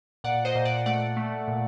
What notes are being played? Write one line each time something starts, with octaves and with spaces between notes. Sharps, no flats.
A#2 D5 F#5
C5 D#5
A#2
D5 F#5
A3 D5 F#5
A3
A#2